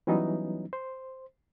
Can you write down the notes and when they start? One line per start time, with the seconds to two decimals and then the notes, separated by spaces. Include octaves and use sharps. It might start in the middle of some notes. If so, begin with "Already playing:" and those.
0.07 E3 F#3 G3 B3 C#4 D#4
0.73 C5